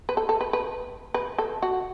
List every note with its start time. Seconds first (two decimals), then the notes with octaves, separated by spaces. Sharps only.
0.09 B4
0.17 A4
0.29 A4
0.41 B4
0.53 B4
1.14 B4
1.38 A4
1.62 F#4